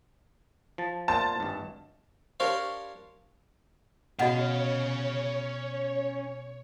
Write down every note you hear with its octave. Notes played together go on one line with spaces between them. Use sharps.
F3 A5
A#2 C5 F#5 A5
G#1 G2
D4 G4 A#4 C5 C#5 F5
B2 C#4 F#4 C#5 D#5 F5 F#5